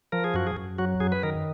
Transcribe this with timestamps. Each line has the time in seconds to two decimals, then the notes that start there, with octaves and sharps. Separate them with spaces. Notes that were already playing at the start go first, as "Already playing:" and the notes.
0.12 F3 A#4
0.24 G#4
0.34 F#2 F#4
0.47 G#4
0.57 F#2
0.78 F#3 F#4
1.00 F#2 G#4
1.12 B4
1.23 D#3 A#4